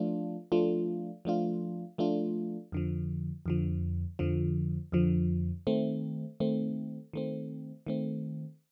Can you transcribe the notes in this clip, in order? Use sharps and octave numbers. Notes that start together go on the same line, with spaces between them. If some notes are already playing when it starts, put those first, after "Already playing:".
Already playing: F3 A3 D4 F4
F3 A3 D4 F4
F3 A3 D4 F4
F3 A3 D4 F4
F2 D3 F3
F2 D3 F3
F2 D3 F3
F2 D3 F3
D#3 A3 C4
D#3 A3 C4
D#3 A3 C4
D#3 A3 C4